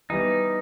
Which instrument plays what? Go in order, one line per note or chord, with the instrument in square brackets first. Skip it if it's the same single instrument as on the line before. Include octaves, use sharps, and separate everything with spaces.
[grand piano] E3 G3 B3 [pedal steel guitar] D#4